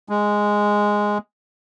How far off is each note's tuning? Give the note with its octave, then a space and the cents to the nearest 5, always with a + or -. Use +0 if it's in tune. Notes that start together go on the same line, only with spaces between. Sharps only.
G#3 -5